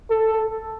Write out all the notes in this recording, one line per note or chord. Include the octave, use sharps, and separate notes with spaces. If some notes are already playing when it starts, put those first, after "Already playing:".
A4